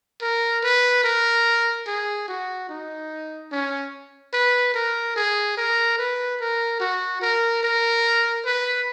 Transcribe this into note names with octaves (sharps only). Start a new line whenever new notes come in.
A#4
B4
A#4
G#4
F#4
D#4
C#4
B4
A#4
G#4
A#4
B4
A#4
F#4
A#4
A#4
B4